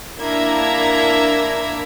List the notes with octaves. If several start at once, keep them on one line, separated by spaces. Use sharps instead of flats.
A#3 D4 E4 E5 A#5 G#6